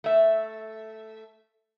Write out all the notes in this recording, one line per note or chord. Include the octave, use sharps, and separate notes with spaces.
A3 E5